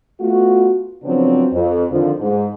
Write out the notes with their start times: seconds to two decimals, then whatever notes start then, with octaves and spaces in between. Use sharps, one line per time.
0.21 A3 B3 F4 F#4
1.04 C#3 F3 F#3 B3 C4 D4
1.53 F2
1.91 F2 D3 D#3 F3
2.20 G#2